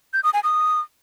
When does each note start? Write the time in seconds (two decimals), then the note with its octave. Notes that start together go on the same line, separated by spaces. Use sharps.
0.13 G6
0.24 D#6
0.34 G#5
0.44 D#6